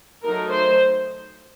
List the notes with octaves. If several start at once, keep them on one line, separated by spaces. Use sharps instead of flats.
F#3 A3 D#4 A#4
C5